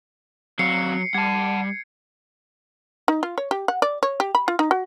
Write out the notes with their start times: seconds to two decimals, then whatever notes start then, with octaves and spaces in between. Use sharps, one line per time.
0.59 F#3 C4 F#4 F5 C7 C#7
1.14 G3 F#5 A5 G#6
3.08 D#4
3.23 F4
3.38 C#5
3.51 G4
3.68 F#5
3.82 D5
4.03 C#5
4.20 G4
4.35 B5
4.48 F4
4.59 D#4
4.71 F#4